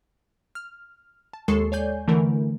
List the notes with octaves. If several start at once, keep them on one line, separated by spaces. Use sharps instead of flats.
F6
A5
D#2 G#3 A4 C#6 C7
C#5 D5 G#5 G6
D3 E3 A3 A#4